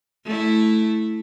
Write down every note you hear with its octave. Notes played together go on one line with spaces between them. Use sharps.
A3 E4